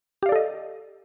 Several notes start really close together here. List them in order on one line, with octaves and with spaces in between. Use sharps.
G4 F5 D5 A4 D#5